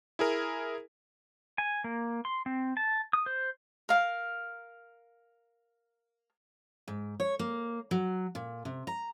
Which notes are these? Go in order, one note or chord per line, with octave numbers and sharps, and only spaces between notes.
E4 G#4 A#4
G#5
A#3
C6
C4
A5
D#6
C5
A#4 F5
G#2
C#5
A#3
F#3
A#2
C3
A#5